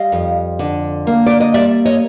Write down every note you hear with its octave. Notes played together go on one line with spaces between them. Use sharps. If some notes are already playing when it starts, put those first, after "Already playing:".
Already playing: G3 D#5 F5
F2
D3
A#3
D5
D#5
G3 D5 E5
C#5 D#5